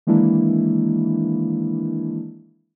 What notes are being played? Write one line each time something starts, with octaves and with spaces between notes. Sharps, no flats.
D#3 E3 G#3 A#3 D4 E4